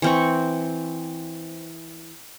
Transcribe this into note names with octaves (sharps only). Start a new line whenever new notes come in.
E3 C4 C#6